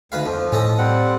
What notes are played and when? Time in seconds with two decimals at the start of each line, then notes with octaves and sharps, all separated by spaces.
0.12 D2 D#3 B4 F5
0.26 F2 F3
0.52 A2 C#4 A4 D#5
0.78 G3 C4 F#5